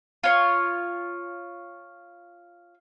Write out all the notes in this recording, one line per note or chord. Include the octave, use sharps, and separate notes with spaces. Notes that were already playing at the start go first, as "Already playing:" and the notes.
F4 C#5